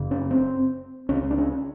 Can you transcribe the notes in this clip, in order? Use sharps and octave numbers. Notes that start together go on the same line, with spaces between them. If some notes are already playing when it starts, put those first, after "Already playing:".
Already playing: F#1 F#2 C#3
C#4
C4
C#2 C#3 C#4
D4
C#4